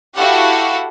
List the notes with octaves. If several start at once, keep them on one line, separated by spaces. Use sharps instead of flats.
E4 F#4 G4 A4 F5 F#5